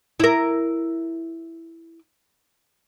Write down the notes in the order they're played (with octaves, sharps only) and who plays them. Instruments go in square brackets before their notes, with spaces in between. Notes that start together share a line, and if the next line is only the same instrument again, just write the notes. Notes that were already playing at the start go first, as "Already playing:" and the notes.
[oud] E4 A#4